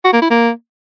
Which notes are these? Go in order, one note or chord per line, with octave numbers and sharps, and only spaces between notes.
F#4
A#3
E4
A#3